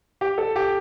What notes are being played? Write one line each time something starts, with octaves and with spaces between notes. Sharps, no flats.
G4
A4
G4